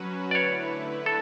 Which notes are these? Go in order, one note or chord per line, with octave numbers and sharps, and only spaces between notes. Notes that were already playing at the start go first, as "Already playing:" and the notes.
Already playing: F#3 C#4 F#4 B4
D5
D3 A3 E4 B4 C#5
A4